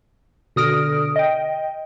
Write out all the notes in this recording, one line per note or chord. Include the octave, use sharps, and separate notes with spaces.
B2 D3 D#6 F6 A#6 D7
D#5 G5